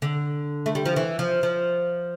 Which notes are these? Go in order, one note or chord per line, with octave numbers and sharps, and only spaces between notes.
D3
A3
G3
F3
E3
F3
F3